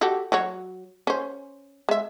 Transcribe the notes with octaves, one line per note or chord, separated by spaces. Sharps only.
F#4 G4 A4
F#3 F#4 C#5
C#4 C5
G#3 E5